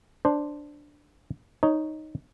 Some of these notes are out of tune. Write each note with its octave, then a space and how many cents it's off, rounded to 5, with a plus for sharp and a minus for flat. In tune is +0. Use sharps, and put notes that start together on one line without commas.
D4 +0 C5 +0
D#4 +0 C#5 +0